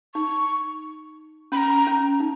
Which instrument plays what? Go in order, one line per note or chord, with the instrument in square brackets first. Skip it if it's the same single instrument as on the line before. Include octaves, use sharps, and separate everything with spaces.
[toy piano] D#4 [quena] C#6
[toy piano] C#4 [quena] B5
[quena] A#5
[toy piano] C#4
D#4